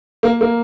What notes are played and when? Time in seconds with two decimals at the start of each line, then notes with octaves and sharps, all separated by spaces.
0.23 A#3
0.41 A#3